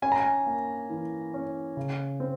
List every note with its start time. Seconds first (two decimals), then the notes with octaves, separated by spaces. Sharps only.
0.02 C#4 G#5
0.12 A#5
0.20 G#5
0.47 A#3
0.90 E3
1.34 C#4
1.77 C#3
2.20 C4